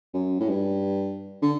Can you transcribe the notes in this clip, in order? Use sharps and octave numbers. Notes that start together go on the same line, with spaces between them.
F#2
A2
G2
D3